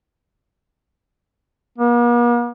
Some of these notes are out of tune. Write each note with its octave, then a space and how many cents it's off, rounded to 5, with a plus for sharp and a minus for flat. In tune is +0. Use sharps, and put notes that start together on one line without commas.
A#3 +45